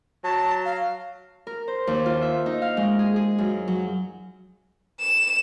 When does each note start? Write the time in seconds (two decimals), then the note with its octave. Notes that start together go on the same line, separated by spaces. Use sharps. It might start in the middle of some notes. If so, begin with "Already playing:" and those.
0.24 F#3 A5
0.65 F5
1.47 A#4
1.68 C5
1.87 D#2
2.06 F4
2.22 E5
2.46 D#4
2.62 F5
2.77 G#3
2.99 G#4
3.16 G#4
3.38 F#2
3.68 F#3
5.00 E7